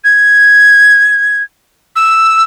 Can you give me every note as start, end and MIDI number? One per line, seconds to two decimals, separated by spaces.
0.04 1.42 92
1.96 2.43 88